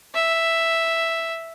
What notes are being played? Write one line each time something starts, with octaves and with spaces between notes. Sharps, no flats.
E5